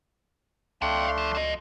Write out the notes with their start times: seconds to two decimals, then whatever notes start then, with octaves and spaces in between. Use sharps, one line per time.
0.82 C#2 A3 D4 F5 G5 C6
1.18 F3
1.35 F3 D#5